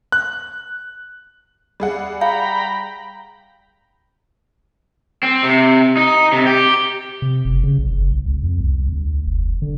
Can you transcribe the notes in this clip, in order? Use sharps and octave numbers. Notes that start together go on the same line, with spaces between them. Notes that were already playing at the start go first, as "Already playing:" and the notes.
F#6
G3 G#4 F#5
F5 G5 A#5 B5
C4
C3
D#4
C3
G4
C3
F#1
C#3
A#1
F#1
B1
C#2
F2
C2
D2
F1
D3